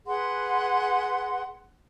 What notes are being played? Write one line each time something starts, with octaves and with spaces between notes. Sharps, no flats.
G#4 B4 F#5 C6